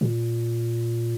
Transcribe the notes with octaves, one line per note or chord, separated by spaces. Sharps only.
A#2